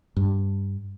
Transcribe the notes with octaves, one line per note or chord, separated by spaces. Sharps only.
G2